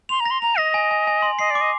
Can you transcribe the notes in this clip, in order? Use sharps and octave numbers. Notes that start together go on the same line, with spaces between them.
C6 F7
A#5
A#6
C6
A#5 F7
D#5 A#6
G#5
G#5
G#5
C6
D#5 C7
D5
D6
D#5